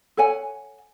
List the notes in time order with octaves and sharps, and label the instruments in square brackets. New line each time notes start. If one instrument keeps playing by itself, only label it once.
[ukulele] A4 C#5 F#5 G#5